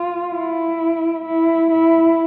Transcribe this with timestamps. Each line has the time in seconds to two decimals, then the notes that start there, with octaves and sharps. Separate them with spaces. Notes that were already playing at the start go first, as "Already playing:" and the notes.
Already playing: F4
0.33 E4
1.25 E4
1.71 E4